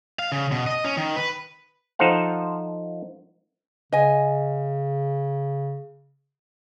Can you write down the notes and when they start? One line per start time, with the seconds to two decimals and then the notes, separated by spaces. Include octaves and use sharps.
0.19 F5
0.32 C#3
0.52 B2
0.67 D#5
0.84 C#4
0.97 D#3
1.16 B4
1.99 F3 D#4 A4 C5 F5 F#5
3.93 C#3 D#5 G#5